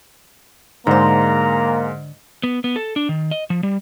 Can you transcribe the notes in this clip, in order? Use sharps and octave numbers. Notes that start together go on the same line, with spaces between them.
G#2 D3 G#3 A#3 C5 A#5
B3
B3
A4
D4
D#3
D#5
F3
G3